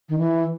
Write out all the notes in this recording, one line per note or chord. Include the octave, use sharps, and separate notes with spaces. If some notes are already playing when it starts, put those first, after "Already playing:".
D#3
E3